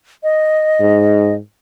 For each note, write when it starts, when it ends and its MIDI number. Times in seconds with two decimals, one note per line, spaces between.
0.23 1.35 75
0.81 1.39 44